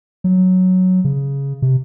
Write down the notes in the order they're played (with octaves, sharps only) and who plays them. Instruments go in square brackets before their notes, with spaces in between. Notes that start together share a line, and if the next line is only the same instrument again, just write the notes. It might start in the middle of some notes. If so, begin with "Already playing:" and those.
[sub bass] F#3
C#3
C3